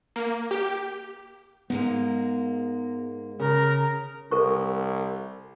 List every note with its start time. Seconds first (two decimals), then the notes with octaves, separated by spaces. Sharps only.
0.16 A#3
0.51 G4
1.70 G#2 G#3 A#3 B3
3.39 C#3 A#4
4.31 C2 A4 A#4 C#6